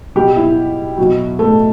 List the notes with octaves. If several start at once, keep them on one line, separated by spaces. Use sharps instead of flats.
B2 G3 G4
E4
B2 F#3
A3